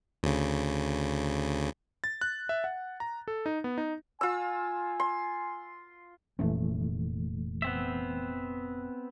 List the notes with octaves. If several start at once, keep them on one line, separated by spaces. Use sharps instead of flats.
D2 C#3
A6
F#6
E5
F#5
A#5
A4
D#4
B3
D#4
F4 G#5 E6
C6
F1 A#2 E3 A3 C#4
B3 C4 E5